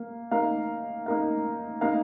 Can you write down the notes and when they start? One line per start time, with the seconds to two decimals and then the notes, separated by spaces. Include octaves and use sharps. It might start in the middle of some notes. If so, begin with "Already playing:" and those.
Already playing: A#3 A#4 F5
0.31 A#3 D#4 A#4 F5
1.06 A#3 D#4 A#4 F5
1.81 A#3 D#4 A#4 F5